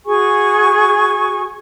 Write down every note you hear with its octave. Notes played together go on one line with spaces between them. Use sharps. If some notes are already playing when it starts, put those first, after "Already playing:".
F#4 G#4 G#5 C#6